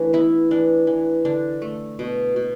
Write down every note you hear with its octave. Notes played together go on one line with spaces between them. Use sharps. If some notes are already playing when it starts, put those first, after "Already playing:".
Already playing: E3 A3 D4
B3 E4
E3 D4
E3
D3 D4
A3
B2
B2